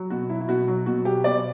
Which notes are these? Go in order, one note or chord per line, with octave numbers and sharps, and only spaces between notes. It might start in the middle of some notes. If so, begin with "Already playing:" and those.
Already playing: F#3
B2 F#4
F#3 E4
E4
B2 F#4
F#3 F#4
B2 F#4
F#3 G4
B2 D5